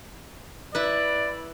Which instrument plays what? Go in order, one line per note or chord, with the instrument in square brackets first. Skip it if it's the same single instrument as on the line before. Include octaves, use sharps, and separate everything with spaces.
[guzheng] E4 B4 [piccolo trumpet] D5